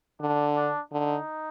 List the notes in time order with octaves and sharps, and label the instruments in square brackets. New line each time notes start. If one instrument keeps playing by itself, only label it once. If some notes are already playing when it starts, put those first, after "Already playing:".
[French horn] D3 [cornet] D4
[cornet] D4
[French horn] D3 [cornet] D#4